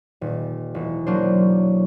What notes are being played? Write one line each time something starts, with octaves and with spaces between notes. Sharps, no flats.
D#1
E1
F#3 A#3 D4 C5